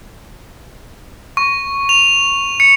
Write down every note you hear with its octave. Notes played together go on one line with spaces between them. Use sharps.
C#6
F7
C#7